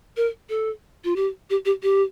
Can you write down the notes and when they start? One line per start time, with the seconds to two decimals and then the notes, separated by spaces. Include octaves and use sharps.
0.17 A#4
0.50 A4
1.04 F4
1.16 G4
1.50 G4
1.65 G4
1.83 G4